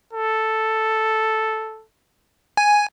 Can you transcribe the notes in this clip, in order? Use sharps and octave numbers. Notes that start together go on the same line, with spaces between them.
A4
G#5